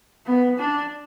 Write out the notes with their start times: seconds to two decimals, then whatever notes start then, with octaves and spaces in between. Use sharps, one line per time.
0.26 B3
0.59 D4